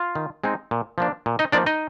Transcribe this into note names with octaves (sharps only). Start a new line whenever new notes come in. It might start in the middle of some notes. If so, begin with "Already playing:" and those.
Already playing: F4 F5
D#3
G#3 C4 D#4
A#2
F3 A#3 D4
A#2
D#4 D#5
F3 A#3 D4 D#4 D5
D#4 D#5